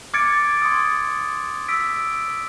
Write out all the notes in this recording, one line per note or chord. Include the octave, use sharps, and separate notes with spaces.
D6 F6 G#6 A6 C#7 D7
C6 D#6
E6 B6 D7